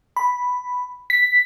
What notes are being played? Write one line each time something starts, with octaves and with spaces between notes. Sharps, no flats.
B5
B6